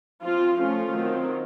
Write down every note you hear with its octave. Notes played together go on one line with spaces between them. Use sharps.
F3 C4 F4
F3 A3 C#4 F4
D#3 F#3 C4